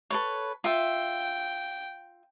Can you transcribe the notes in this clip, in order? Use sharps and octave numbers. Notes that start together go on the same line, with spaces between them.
A4 B4 C#5
F4 E5 G5